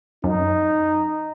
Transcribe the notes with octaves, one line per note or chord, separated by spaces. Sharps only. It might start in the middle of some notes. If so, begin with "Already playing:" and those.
F#2 D#4